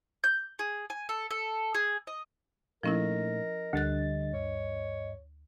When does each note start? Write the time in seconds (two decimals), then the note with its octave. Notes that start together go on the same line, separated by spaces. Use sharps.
0.24 G6
0.59 G#4
0.90 G#5
1.09 A4
1.31 A4
1.74 G#4
2.07 D#5
2.83 A#2 F3 A3 C#4 D#4 E4 A#4 D#5
3.73 D2 D3 G3 F#6 A6
4.34 G2 C#5